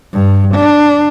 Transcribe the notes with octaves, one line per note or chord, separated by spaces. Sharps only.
G2
D4